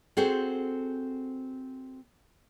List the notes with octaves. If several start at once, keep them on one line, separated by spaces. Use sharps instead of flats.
C4 F#4 G#4 A4 C5